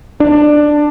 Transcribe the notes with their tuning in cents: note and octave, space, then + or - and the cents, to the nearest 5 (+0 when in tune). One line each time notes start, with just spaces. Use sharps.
D4 +15